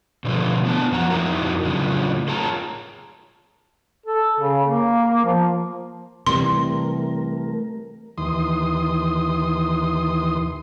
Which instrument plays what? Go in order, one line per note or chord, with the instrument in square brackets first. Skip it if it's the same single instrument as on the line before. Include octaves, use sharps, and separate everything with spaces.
[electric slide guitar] B2 D3 F3 A3
B3 D4 A5
F#2 F3 F#5 A#5
F2 D#4 E4 F#4 A#4
A2 C#3 F#3 D4 F4 G#4
F4 G#4 C#5 G5 A5 A#5
[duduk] A4
C#3
A#3
F3
[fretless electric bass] C3 E3 G3 [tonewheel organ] A3 A#4 [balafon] C6
[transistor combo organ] D#2 E3 C6 D#6